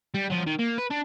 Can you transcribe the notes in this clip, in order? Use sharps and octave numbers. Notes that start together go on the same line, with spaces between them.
G3
F3 F#3
D#3
A#3
B4
D4